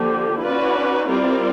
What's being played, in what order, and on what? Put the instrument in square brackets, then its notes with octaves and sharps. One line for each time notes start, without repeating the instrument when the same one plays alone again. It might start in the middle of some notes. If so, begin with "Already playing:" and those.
Already playing: [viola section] D3 F3 A#3 [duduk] G4
[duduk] E4
[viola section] C#4 F#4 B4 D5 [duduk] F4
[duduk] E4
D4
D#4
[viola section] G3 C4 F4 A#4 D5 [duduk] E4